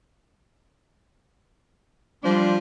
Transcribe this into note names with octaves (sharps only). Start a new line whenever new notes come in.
F3 G3 D4 C5